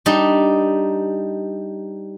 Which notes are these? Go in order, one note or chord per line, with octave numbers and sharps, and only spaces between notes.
G3 D4 D#4